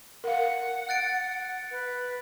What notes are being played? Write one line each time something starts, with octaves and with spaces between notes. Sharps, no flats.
A#4 F5 F#5
F#6 A6 D7
B4